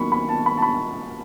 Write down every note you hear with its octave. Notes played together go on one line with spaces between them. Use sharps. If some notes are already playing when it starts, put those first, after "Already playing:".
Already playing: D#2 D#3 F#3 C#4 B5 C#6
B5
A5
B5
A5
B5